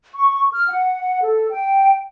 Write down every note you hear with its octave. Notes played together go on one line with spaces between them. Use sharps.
C#6
F6
F#5
A4
G5